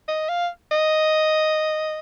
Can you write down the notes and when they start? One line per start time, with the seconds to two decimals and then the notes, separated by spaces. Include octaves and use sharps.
0.08 D#5
0.29 F5
0.71 D#5